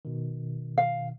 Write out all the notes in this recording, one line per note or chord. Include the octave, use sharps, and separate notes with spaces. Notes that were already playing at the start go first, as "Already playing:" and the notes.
B2 D#3
F5